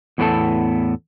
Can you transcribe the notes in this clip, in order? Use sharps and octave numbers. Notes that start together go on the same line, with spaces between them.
E2 A2 B3 D4 A4 A5